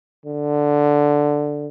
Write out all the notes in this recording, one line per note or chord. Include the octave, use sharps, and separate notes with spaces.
D3